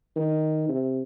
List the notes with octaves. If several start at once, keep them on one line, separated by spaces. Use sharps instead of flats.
D#3
C3